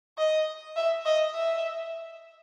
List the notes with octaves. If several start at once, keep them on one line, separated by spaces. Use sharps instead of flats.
D#5
E5
D#5
E5